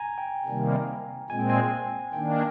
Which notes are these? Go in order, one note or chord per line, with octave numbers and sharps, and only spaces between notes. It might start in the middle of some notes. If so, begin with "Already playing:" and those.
Already playing: G#5 A#5
G5
C3 D#3 G3 A#3
A#2 G#3 C4 G#5
G5
G#5
D#3 A#3 D4 G5